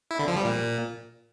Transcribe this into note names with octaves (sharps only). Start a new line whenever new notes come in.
E4
D3
F3
G3
A#2